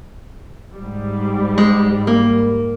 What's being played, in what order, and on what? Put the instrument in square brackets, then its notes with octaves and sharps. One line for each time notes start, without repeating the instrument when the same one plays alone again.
[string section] G#2 G3
[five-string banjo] G#3
A#3